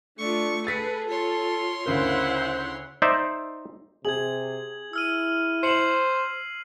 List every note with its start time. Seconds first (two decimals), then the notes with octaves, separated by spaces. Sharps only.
0.18 A3 D4 F4 C#6
0.67 G#4 A4 B4 A6 B6 C#7
1.09 F4 C#5 C6
1.86 D2 C#3 E4 A#4 C5 F#5
3.02 D#4 C5 D5 E5
4.05 C3 G#4 G#6 F#7
4.93 E4 E6 F6 D#7
5.63 C5 C7 C#7 E7 F#7